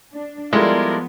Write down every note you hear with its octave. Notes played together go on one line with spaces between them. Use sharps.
D4
F3 G3 G#3 B3 E4 F4 A4 A#4